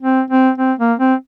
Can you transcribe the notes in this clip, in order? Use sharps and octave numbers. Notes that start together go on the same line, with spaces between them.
C4
C4
C4
A#3
C4